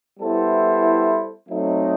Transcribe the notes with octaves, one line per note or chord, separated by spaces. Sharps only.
G3 B3 E4 A4 C5
F#3 A3 C4 D#4